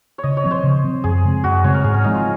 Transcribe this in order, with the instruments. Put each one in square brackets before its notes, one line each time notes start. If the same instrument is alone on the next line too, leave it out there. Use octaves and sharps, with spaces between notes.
[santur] C#5
[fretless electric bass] C#3 [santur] D#5
[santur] C#5
[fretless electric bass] F3 C4
[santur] C5
[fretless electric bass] C#3
F3 C4
[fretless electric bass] F#2 [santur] G#4
[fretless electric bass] C#3 G#3 C4
[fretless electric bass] F#2 [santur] F#4
[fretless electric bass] C#3 G#3 C4 [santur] C#5
[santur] A#4
[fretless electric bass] G#2 [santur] G#4
[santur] C#4
[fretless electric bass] F3 G#3 C4 [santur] D#4
[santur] F4